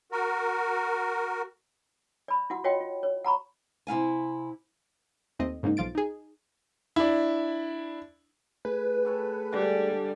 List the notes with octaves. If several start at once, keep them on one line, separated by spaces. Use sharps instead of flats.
F#4 A#4
D5 B5
E4 F#4 F#5
F4 F#4 C#5 D#5 F#5 G5
F4
C#5
F#5 A#5 B5 C#6
C3 E4 F5 G#5
D#2 A3 C4 D#5
G#2 C#3 A#3 D#4
B1 F3 F4 A6 D7
D#4 G#4
D4 E4
A3 G#4 B4
G4 A4 C#5
D3 G3 G#3 D4